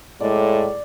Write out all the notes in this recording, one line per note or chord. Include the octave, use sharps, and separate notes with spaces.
A2 G#3 D5